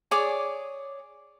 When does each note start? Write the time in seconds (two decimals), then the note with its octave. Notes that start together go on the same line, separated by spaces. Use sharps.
0.11 G#4 C#5 D5 D6